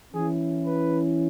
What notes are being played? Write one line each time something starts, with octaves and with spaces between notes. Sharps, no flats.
E3 C#4 E4 G#4
B4